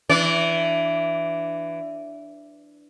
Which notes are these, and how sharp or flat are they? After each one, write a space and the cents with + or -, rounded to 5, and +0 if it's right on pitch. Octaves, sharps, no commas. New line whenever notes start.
E3 +15 D4 +0 D5 -40